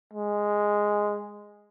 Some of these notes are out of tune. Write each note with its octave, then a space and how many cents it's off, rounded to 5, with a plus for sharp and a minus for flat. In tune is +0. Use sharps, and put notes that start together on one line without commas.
G#3 -5